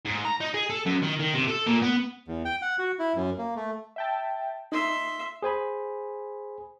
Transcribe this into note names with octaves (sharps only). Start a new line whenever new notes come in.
G#2
A#5
D#4
G#4
A4
F#2
D#3
D#3
C3
A4
A#2
B3
E2
G5
F#5
F#4
E4
F#2
A#3
A3
E5 G5 A5
D#4 E5 C6
G#4 C5 G#5 B5